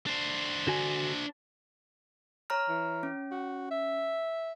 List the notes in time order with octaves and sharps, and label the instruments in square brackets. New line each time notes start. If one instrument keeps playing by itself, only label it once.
[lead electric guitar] D4 C5
[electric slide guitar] D3 F#4 G#5
[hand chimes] C#5 A#5 F6
[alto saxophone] E3
[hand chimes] C#4
[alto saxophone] F#4
E5